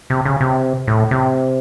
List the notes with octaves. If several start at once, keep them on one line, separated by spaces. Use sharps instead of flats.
C3
C#3
C3
A2
C3